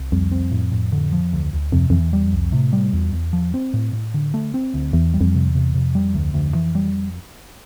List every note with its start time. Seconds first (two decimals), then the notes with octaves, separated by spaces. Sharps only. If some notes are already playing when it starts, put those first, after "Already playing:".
Already playing: C2
0.12 F2 G3
0.32 C4
0.51 A2
0.72 A2
0.92 D3
1.12 F3
1.33 D2
1.53 D2
1.72 F2 C3
1.90 F2 E3
2.00 E2
2.13 G3
2.26 F2
2.33 C2
2.52 A2 C3
2.73 G3
2.93 E2
3.13 E2
3.33 F3
3.54 C4
3.74 A2
3.93 A2
4.14 D3
4.34 A3
4.54 C4
4.74 D2
4.93 E2 E3
5.14 G3
5.21 F2
5.35 C3
5.48 E2
5.55 C3
5.74 F2 C3
5.95 G3
6.14 D2
6.34 D2
6.55 E3
6.75 G3